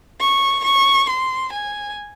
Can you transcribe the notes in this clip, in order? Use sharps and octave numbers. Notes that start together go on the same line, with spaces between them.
C#6
C#6
C6
G#5